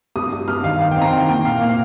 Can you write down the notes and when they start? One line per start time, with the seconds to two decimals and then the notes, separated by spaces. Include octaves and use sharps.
0.16 G2 D#6
0.32 G3
0.48 G2 F6
0.64 D#3 F5
0.80 D#3 F5
0.91 G5
0.97 C4 A#5
1.12 D#3 G5
1.29 A#3 G5
1.45 A#2 F5
1.61 A#3
1.69 F5